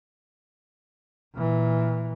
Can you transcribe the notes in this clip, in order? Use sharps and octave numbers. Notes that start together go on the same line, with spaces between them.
A#2 E3